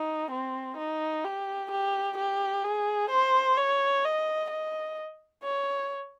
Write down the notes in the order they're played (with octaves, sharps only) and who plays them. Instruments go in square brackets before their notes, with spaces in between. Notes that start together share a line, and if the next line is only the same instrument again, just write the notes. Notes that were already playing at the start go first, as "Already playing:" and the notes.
Already playing: [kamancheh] D#4
C4
D#4
G4
G4
G4
G#4
C5
C#5
D#5
D#5
C#5